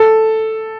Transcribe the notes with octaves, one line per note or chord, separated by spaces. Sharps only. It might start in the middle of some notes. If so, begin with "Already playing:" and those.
Already playing: A4